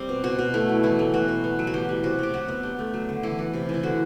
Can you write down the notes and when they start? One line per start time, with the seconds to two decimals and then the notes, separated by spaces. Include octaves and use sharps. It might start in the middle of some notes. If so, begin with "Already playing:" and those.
Already playing: G3 C4
0.09 B2
0.24 B2 F#4
0.39 B2
0.54 A3 E4
0.69 F#3
0.83 E3 E4
0.99 A3
1.14 B2 F#4
1.28 B2
1.44 B3
1.59 F#3
1.67 F#4
1.74 E3 G4
1.89 G3
2.03 C3 F#4
2.19 C4 G4
2.34 F#3 F#4
2.48 B3
2.63 D4 G4
2.79 A3
2.94 F#3
3.09 D3
3.23 E3 E4
3.39 E3
3.54 C3
3.69 E3
3.74 E4
3.83 D3 F#4